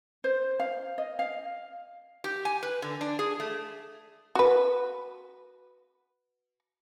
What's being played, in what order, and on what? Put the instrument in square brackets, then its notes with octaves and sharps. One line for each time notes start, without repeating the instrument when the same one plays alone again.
[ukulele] C5
F5
D#5
F5
[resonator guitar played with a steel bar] G4
G#5
B4
D3
D4
G#4
A3
[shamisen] F#4 B4